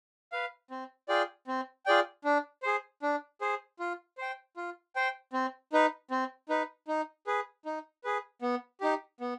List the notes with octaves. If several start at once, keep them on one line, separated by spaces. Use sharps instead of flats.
B4 F5
C4
F4 G#4 D5 G5
C4
F4 G#4 D5 G5
D4
G#4 C5
D4
G#4 C5
F4
C5 G5
F4
C5 G5
C4
D#4 B4
C4
D#4 B4
D#4
G#4 B4
D#4
G#4 B4
B3
D#4 G4
B3